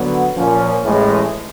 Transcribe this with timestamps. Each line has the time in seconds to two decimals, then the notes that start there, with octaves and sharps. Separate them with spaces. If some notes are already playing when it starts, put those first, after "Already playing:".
Already playing: D3 F#3 B3
0.36 A#2 F3 A#3 C#4
0.84 A1 A2 E3 G#3